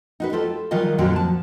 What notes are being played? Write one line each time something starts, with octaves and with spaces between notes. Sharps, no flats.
D#4 F#4 B4
F4 G4 A4 C5
D#3 F#3 G3 F4 G#4 D#5
F2 A#2 D3 F#3 C4 F#4
F3 A5